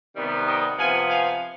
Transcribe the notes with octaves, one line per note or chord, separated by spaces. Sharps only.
C3 D#3 G3 B3
D#5 G5
C3 F3 B3 F5 G#5
F5 G#5